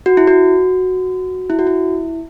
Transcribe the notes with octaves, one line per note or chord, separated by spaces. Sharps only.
F#4
E4
F#4
E4
F#4
E4